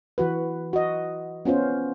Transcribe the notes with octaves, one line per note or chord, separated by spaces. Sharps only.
E3 F#4 B4
F#4 D#5
B3 C#4 F4 C5